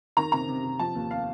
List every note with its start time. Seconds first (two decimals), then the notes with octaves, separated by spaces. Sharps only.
0.17 D#3 A#5
0.32 C3 A#5
0.48 C3
0.64 C3
0.79 F3 A5
0.95 D#2
1.11 F5